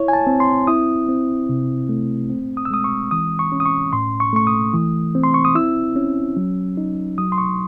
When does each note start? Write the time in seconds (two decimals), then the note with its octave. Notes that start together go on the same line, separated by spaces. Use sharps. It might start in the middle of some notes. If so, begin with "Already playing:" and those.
Already playing: E4 C#5
0.08 G#5
0.13 A5
0.27 C4
0.40 C6
0.67 E4 D#6
1.09 C4
1.49 C3
1.89 A3
2.30 C4
2.57 D#6
2.65 E6
2.71 G#3 D#6
2.84 C#6
3.11 E3 D#6
3.39 C#6
3.52 C#4
3.60 D#6
3.66 C#6
3.93 A2 C6
4.20 C#6
4.33 A3 C#6
4.47 D#6
4.74 E3
5.15 C4
5.23 C6
5.34 C#6
5.45 D#6
5.55 E4 E6
5.96 C#4
6.37 F#3
6.77 D#4
7.18 F#3 D#6
7.32 C6
7.38 C#6